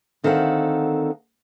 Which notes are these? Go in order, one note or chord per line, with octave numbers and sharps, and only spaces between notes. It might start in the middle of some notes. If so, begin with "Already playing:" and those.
D2 D#3 C4 A4 F5 F#5